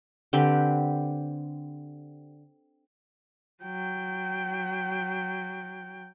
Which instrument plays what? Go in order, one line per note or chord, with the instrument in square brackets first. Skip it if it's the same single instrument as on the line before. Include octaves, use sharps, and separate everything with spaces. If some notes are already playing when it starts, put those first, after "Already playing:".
[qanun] D3 C4 G4 B4
[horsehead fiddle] F#3 G5